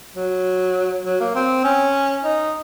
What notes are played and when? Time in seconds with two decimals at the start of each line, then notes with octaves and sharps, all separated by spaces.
0.16 F#3
1.05 F#3
1.20 A#3
1.35 C4
1.64 C#4
2.24 D#4